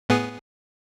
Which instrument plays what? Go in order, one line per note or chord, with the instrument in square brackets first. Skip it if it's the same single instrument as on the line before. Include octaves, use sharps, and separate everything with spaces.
[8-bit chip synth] A2 B3 G#4